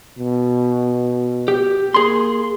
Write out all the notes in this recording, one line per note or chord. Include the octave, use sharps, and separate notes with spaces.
B2
G4
A#3 G#4 C6